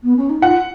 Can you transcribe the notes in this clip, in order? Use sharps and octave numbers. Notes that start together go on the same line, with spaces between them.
B3
C#4
D#4
F4 F#5